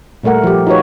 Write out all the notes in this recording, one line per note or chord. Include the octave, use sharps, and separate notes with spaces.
A#2 G3 A3 A#4 F#5
F3 G4
D#4 F4 F#4 B4 C#5